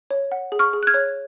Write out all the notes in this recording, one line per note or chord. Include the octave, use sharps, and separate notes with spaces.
C#5
F#5
G#4
C#6 F6
G#4
F#6
F6 G#6
C#5